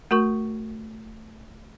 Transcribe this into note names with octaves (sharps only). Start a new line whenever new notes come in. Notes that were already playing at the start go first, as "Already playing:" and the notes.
A3 F#4 A#4 C#6